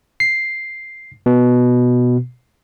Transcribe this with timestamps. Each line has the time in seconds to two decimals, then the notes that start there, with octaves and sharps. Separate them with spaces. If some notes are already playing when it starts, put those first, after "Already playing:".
0.20 C7
1.26 B2